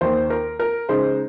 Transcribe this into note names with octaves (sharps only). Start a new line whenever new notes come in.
D#2 D#3 A#3 C5
A#4
A#4
C#3 G#3 D#4 C5